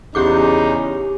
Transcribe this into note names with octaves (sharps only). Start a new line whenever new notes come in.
E2 C#3 C#4 D#4 G4 G#4 D6